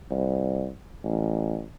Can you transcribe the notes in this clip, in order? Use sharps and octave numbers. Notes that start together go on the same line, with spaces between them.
C2
A1